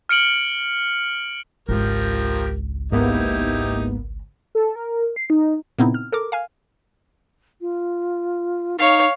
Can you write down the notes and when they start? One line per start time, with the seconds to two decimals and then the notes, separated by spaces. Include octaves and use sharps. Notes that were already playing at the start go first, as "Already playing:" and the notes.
0.09 F6 C#7 D7 F#7
1.69 G#1 C#2 F3 G4 A#4
2.92 G#2 A#3 B3 D#4 E4 G4
4.55 A4
4.76 A#4
5.16 C7
5.30 D#4
5.79 A#2 C#3 B3 C4 D#4 E4
5.94 F6
6.12 A4 A#4 D6
6.32 F5 G#5 F6
7.61 F4
8.79 D#4 C#5 F5